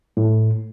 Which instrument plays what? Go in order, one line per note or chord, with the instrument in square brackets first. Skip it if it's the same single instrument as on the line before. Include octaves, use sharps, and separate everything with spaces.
[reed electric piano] A2